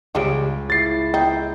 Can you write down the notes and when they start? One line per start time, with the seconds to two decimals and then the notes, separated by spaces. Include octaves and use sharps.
0.15 C#2 G3 G#3 F4 D7
0.70 E4 A6 C7
1.14 D#4 G5